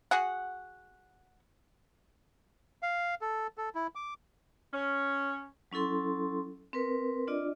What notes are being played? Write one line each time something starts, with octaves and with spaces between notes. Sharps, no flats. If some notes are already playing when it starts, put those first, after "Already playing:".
F#4 G#4 F#5
F5
A4
A4
E4
D6
C#4
F#3 C#4 E4 A4 C6
C4 A#4 B4
D4 F4 D5 D#5